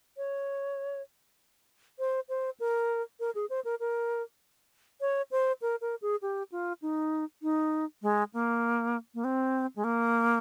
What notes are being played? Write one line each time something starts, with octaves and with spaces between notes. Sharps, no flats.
C#5
C5
C5
A#4
A#4
G#4
C5
A#4
A#4
C#5
C5
A#4
A#4
G#4
G4
F4
D#4
D#4
G#3
A#3
A#3
C4
G#3
A#3